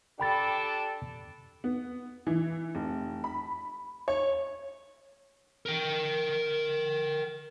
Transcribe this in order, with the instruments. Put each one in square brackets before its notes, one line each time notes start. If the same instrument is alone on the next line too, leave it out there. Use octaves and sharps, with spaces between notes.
[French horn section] D4 G4 A4 [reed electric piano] G5 B5 A6
[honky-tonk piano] B3
E3
F1
B5
C#5
[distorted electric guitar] A#4 G5